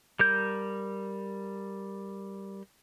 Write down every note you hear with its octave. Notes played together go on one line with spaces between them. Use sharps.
G3 A#4 G6